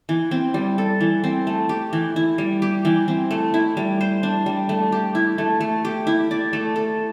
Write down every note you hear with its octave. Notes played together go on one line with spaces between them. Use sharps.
E3
C4
G3
A4
E3
C4
A3
G4
E3
E4
G3
G4
E3
C4
A3
E4
G3
C5
D4
G3
A3
G4
E4
A3
A3
G4
E4
D5
A3
A4